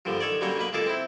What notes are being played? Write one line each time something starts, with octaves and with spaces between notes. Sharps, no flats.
G2 A#2 D3 F3
D#3 A4 C#5 D5
D3 F#3 G3 A#3 C#4 C#5
B2 A#3 B4
C#2 A#3 G#4 A4 D6
C4 E4